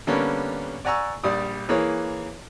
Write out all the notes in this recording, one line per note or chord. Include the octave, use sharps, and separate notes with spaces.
D3 G3 A#3 B3 C#4
D5 F#5 G#5 A#5 C#6 E6
A#1 G3 D5 D#6
E3 A#3 G#4 B4 C#5